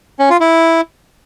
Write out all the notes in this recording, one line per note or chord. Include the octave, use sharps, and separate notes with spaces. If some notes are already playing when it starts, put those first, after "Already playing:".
C#4
F4
E4